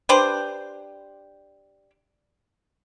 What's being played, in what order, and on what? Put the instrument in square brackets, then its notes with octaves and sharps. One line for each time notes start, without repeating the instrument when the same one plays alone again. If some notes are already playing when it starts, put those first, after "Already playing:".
[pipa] D4 G4 B4 C5